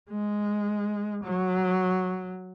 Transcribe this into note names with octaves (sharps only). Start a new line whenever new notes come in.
G#3
F#3